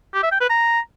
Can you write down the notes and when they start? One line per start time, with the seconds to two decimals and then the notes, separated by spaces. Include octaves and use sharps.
0.14 G4
0.23 E5
0.32 G5
0.40 B4
0.49 A#5